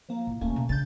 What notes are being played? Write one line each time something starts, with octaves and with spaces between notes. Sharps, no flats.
F3 A#3
A2
D#1 A3 A#3 C#4
B2
C#3 D4 G6 A6